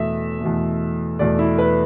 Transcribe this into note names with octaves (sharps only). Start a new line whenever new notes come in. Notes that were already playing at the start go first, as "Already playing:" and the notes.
Already playing: E2 B2 A3 E5
E2 B2 A3
E2 B2 A3 D5
E4
B4